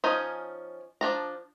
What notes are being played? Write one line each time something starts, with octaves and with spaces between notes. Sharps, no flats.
F3 C#4 D#4 G#5 A#5
F3 D4 A#5